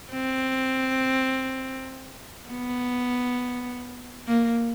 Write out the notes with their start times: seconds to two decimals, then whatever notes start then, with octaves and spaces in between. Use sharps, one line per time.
0.13 C4
2.49 B3
4.27 A#3